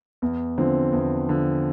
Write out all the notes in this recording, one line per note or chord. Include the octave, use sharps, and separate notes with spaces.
E2
D3 F3 C4
E2
D3 F3 C4